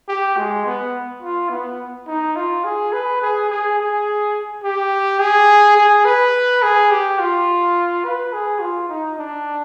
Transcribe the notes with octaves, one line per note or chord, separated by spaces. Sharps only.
G4
G#3
B3
F4
B3
D#4
F4
G#4
B4
G#4
G#4
G#4
G4
G#4
G#4
B4
G#4
G4
F4
B4
G#4
F4
D#4
D4